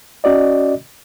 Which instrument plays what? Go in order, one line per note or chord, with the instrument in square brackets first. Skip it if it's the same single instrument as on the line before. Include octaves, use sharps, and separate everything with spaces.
[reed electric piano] C#4 F#4 D5 D#5